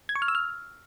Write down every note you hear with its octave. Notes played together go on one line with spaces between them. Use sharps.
G#6
C#6
F6
E6
F6